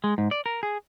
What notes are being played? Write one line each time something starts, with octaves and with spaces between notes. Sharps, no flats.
G#3
G#2
D5
A#4
G#4